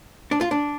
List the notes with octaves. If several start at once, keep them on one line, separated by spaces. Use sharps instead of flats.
D4
F4
D4